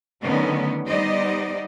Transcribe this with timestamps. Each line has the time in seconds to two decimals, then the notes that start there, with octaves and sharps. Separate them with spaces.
0.22 D3 D#3 F#3 A3 B3 C#4
0.87 G3 B3 D#4 C5 D5 D#5